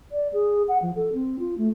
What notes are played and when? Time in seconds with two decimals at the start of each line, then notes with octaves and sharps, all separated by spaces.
0.12 D5
0.33 G#4
0.68 F#5
0.82 F3
0.96 A4
1.13 C4
1.39 F4
1.58 A3